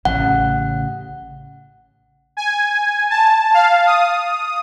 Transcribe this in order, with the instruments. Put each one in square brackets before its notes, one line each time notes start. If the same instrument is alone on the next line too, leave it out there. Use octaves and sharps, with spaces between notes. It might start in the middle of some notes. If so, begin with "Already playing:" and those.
[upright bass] A1 C#3 [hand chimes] F#5
[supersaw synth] G#5
A5
F5
D#6